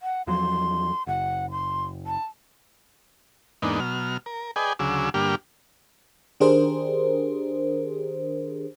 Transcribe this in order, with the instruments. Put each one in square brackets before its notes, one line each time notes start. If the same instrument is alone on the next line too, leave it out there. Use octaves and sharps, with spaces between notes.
[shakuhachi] F#5
[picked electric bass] E2 F3 F#3 [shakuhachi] C6
[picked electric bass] F#1 [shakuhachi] F#5
[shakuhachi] C6
A5
[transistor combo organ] E2 G#2 A#3 B3 D4 D#4
B2 F#3 F6
A#4
G#4 B4 D5 D#5 G5 G#5
D2 C#3 F#3 G#4 D6 E6
G2 D3 A#3 G4 D6 F6
[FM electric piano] D#3 D4 G4 G#4 A#4 C5